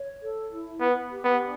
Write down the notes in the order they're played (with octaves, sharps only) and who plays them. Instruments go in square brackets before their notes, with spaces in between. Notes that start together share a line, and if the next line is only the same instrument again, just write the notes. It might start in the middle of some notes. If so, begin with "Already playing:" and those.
Already playing: [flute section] C#5
A4
E4
[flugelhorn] B3 [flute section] B4
[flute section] G4
[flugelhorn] B3
[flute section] D4